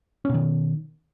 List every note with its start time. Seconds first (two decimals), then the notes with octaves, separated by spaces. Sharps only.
0.25 C#4
0.30 B2
0.34 D#3